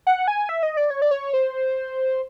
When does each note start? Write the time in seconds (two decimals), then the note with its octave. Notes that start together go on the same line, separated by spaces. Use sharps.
0.07 F#5
0.28 G#5
0.49 E5
0.63 D#5
0.77 D5
0.90 C#5
1.02 D5
1.11 C#5
1.34 C5